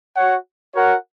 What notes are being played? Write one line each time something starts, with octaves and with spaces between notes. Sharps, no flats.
F#4 C#5 F#5
F#4 A#4 C#5 F#5